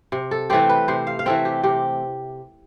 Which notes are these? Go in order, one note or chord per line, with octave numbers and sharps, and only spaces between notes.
C3
A4
E3 A3 C4 G4
B4
C3 C5
F5
F5
E3 A3 C4 E5
G4
C3 G4